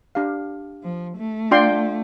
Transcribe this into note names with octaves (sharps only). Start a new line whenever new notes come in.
D4 G4 F5
F3
A3
D4 F4 D5 G5 C6